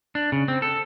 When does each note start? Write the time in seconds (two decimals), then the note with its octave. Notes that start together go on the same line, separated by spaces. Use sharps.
0.15 D4
0.32 C#3
0.48 C4
0.62 A4